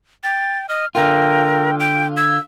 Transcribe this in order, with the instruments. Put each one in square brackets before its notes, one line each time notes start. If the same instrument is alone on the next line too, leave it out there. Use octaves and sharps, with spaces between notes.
[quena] G5 [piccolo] A6
[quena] D#5 [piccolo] F6
[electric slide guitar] D3 F4 [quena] A#4 [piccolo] G5
[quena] G5 [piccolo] D7
[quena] E6 [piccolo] G#6